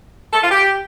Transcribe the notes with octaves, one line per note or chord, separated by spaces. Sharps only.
A4
F4
G4